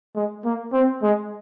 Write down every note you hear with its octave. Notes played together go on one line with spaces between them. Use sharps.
G#3
A#3
C4
G#3